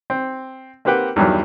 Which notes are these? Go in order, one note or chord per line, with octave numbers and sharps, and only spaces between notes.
C4
A#3 C4 G4 B4 F#5 G5
E2 G2 D#3 F#3 G3